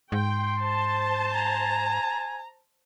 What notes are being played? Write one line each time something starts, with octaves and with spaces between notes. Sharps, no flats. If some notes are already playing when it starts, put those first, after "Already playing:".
G#2 G5 C6
C5 A5
G#5 A#5